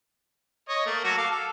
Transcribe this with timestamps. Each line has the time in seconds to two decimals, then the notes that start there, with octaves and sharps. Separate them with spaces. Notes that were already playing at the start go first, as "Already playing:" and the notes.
0.69 C#5 D#5
0.86 A3 A#3
1.04 F#3 F#4 A4
1.17 A4 F5 D6
1.31 A4